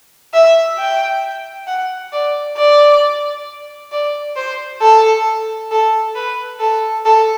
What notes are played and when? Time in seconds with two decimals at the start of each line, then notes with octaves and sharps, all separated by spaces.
0.34 E5
0.78 G5
1.67 F#5
2.13 D5
2.57 D5
3.92 D5
4.36 C5
4.81 A4
5.71 A4
6.16 B4
6.60 A4
7.06 A4